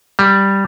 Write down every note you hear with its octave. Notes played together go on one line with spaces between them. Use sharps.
G3